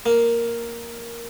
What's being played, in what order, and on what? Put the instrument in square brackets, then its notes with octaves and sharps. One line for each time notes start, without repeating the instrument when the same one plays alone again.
[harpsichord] A#3